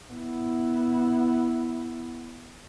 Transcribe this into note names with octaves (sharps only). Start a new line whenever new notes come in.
B3 E4